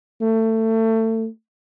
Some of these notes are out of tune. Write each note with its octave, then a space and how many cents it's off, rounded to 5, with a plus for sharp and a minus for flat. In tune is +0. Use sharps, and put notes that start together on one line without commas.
A3 +25